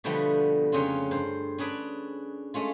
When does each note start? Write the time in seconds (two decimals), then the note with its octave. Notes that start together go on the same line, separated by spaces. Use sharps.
0.04 B2 D3 F3 G3 A3 B3
0.72 F2 C#3 C#4 F4
1.11 G2 C5
1.58 C#4 D4 G#4 B4 D5
2.54 G#3 A3 C#4 F4